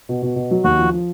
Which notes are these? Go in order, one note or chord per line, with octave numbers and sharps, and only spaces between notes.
B2
B2
B2
F#3
D#2 F#4
F3
F3